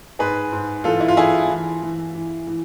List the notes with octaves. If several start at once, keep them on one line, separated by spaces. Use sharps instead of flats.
G#2 G#4 B4
G#2
E3 F4 A4
E4
F4
E3 E4 G#4
E3
E3
E3
E3